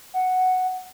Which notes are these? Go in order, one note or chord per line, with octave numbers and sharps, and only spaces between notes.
F#5